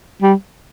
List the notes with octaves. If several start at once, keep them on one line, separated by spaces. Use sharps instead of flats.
G3